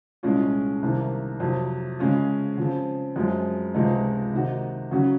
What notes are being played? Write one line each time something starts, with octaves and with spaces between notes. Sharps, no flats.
C2 A#2 G#3 C#4 F4
C2 C3 D#3 A#3
F2 C3 F#3
C#3 G#3 C#4 F4
C#3 F3 C4
F#2 F3 G#3 C4
C#2 C3 F3 G#3 D#4
C3 D#3 A#3 D#4 F#4
C#3 F#3 C#4 F#4